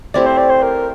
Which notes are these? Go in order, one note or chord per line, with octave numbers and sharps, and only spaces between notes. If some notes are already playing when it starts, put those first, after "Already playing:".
A3 C4 E4 G4 D5
C5
D5
C5
A#4